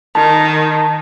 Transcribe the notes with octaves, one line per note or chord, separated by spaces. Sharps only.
D#3 A5